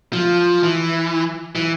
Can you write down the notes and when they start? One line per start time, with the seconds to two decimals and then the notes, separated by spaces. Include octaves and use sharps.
0.13 F3
0.63 E3
1.55 E3